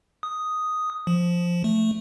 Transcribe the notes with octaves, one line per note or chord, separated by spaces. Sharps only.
D#6
F3
A3